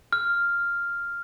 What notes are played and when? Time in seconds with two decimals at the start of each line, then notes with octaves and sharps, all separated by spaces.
0.13 F6